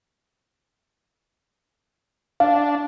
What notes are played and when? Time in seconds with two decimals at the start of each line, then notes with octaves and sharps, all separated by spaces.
2.40 D4 F5